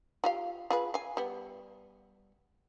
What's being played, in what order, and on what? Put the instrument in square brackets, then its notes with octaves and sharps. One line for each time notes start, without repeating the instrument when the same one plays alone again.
[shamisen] F4 G4 F5
F4 G#4 B4
F5 G#5
G3 B3